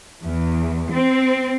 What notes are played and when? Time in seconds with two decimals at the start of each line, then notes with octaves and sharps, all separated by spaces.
0.23 E2
0.92 C4